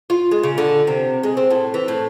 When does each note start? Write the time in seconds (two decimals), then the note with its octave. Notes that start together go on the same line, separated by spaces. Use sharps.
0.10 F4
0.31 G#3
0.43 C#3
0.58 D3
0.87 C3
1.23 G#3
1.37 C4
1.51 A2
1.74 E3
1.88 A2